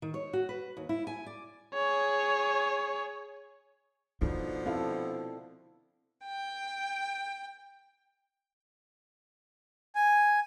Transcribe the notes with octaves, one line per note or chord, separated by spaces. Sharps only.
D#3
C#5
F#4
B4
D#2
E4
G#5
D5
G#4 C#5
B2 D3 F3 D#4
C4 E4 A4 F5
G5
G#5